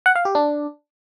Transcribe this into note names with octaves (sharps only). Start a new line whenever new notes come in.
F#5
F5
G4
D4